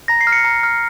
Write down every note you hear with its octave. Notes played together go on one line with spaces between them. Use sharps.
A#5 A#6
C7
F6
C#7
A#5
F6